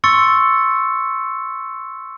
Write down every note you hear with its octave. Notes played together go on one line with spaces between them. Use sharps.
C6 C#6 E6 A6 C#7